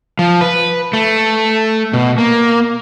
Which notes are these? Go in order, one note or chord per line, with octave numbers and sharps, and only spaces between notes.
F3
B4
A3
B2
A#3